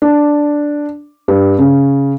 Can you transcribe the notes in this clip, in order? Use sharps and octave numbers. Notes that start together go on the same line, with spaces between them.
D4
G2
C#3